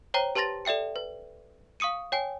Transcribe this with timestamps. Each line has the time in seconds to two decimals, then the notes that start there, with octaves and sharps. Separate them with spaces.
0.14 C5 C#5 G5 A#5
0.35 G4 B4 A5 C6 A6 A#6
0.65 A4 D5 E5 G5 C#7
0.96 B4
1.80 F5 C#6 D#6 C#7 D#7
2.12 C#5 G5 G#5